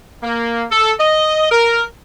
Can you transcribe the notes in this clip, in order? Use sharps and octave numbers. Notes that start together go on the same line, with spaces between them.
A#3
A4
D#5
A#4